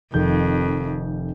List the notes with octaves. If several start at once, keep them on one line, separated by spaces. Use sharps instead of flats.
F1 F2 D#3 G6